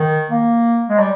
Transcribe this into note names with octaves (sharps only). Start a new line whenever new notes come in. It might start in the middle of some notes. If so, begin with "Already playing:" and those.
Already playing: D#3
A#3
G#3
G3